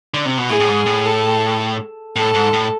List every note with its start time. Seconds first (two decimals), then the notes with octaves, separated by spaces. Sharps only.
0.14 D3
0.25 C3
0.38 B2
0.50 A2 G#4
0.60 A2
0.68 G#2
0.86 A2
1.05 A4
2.16 A2 A4
2.34 G#2
2.53 A2